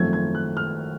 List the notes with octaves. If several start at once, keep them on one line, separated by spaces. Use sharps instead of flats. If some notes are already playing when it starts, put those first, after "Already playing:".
Already playing: G#1 F#2 F3 A3 G#6
G#6
F#6
F6